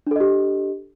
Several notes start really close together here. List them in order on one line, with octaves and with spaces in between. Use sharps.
D4 A4 D#5 G4